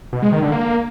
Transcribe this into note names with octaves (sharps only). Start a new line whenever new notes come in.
B2
G#3
D#3
D3
A#3